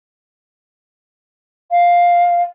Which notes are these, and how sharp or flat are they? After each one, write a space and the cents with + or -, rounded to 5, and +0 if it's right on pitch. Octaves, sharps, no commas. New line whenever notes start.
F5 +5